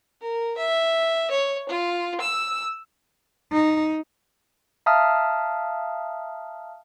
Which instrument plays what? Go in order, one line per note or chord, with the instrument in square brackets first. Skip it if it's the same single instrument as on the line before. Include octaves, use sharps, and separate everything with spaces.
[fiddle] A#4
E5
C#5
F4
E6
[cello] D#4
[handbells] E5 F5 A5 A#5 D#6 F6